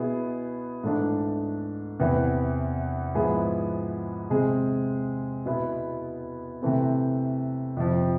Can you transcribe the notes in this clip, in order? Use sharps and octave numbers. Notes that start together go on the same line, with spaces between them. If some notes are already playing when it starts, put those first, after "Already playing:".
Already playing: B2 B3 E4 G#4
G#2 E3 A3 D4
E2 C3 E3 B3 E4
G#2 F3 B3 E4 G#4
C3 G#3 C4 G#4
B2 B3 E4
C3 E3 A3 C4
F2 C3 F3